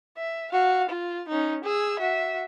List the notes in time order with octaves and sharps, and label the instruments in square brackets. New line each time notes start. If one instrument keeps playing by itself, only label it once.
[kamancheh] E5
F#4 F5
F4
C#4 D#4
G#4 E6
F#4 E5